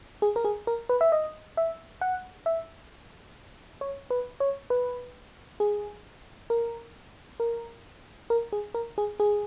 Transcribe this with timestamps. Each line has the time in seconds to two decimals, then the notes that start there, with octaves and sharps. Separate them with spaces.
0.22 G#4
0.36 A#4
0.44 G#4
0.67 A#4
0.89 B4
1.01 E5
1.12 D#5
1.57 E5
2.01 F#5
2.46 E5
3.81 C#5
4.10 B4
4.40 C#5
4.70 B4
5.60 G#4
6.50 A#4
7.40 A#4
8.30 A#4
8.53 G#4
8.74 A#4
8.98 G#4
9.20 G#4